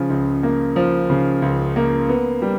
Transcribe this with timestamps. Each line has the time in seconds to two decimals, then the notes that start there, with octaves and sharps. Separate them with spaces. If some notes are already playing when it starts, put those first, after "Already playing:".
Already playing: C#3 F3
0.10 C#2
0.43 A#3
0.76 F3
1.10 C#3
1.42 C#2
1.76 A#3
2.09 B3
2.42 G3